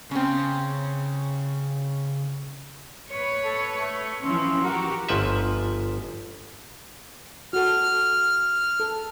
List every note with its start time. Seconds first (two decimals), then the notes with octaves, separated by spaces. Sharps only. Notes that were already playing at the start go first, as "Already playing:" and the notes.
0.11 C#3 C4 C#4
3.11 B4 C#5
3.44 A4
3.78 A3
4.22 E3 F3 C4 C#4
4.64 F#4 G4 A#4
5.09 G1 G#2 F3 B4 E5
7.53 F#4 A4 F6
8.80 A4